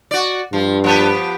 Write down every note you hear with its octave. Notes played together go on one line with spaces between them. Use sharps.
F#4 D5
G2 F3
F3 B3 G4